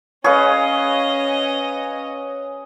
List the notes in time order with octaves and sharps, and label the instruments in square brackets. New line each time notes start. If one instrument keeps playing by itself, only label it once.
[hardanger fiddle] C#4 D#5 [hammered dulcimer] G#4 B4 F5 [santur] C#5